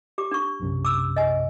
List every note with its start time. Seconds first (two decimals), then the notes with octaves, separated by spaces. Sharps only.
0.18 G4 D6
0.31 D4 C#6
0.60 B1 F#2 C3
0.85 D6 E6
1.16 D#5 G#5